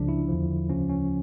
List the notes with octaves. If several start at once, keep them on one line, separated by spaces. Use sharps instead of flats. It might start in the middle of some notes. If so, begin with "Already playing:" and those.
Already playing: C#2 C#3 F3 D4
E4
E2 D3 F3
D2 C#3 F3 C#4
C#4